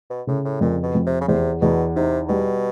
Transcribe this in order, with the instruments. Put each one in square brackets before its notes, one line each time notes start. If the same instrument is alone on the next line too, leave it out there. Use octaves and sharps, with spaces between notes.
[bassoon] B2
[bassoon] A2 [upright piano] C#3
[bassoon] A2
[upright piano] F2 [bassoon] A#2
[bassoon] B2
[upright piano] F2
[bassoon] C3
C#3
[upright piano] E2 [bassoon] C3
[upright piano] E2 [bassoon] B2
[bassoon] C3 [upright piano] D#4
[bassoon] B2 [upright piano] G3